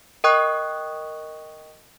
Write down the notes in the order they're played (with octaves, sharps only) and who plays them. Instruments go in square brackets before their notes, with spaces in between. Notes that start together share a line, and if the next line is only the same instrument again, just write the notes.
[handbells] A#4 D#5 G5 C#6 D#6 F#6